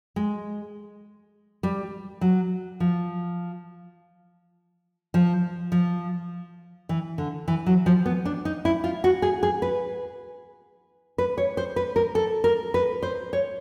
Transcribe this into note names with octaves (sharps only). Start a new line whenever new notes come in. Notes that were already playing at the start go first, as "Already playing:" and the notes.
G#3
G3
F#3
F3
F3
F3
E3
D3
E3
F#3
F3
B3
D4
D#4
E4
F4
F#4
G#4
G#4
B4
B4
C#5
C5
B4
A#4
A4
A#4
B4
C5
C#5